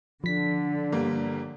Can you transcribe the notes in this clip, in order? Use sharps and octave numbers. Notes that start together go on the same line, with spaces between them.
D3 F3 B6
G1 G3 A#3